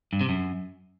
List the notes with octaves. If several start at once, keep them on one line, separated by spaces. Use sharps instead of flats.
G2
C3
F#2